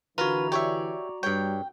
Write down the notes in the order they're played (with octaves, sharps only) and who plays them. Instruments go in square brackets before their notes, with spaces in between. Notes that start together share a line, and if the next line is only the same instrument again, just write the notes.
[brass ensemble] D3 E3 [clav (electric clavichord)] F4 A#4 [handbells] F#4 A#5 [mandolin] B4
[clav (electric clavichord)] G4 C#5 E5 [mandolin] D5 C#6
[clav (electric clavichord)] G2 C#5 [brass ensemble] G3 [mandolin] G5